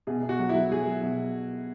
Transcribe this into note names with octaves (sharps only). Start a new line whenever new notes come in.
B2 G#4
B2
F#4
F#3
E4
F#3
F#3 G#4
F#3
B2